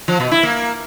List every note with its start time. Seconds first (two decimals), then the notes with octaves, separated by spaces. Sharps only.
0.08 F3
0.20 B2
0.32 E4
0.43 A#3